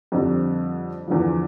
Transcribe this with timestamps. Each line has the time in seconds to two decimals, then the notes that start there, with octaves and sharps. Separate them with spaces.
0.12 F2 D3 G3
1.07 E2 D3 F3